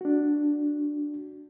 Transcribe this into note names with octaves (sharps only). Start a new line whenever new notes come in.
D4 F#4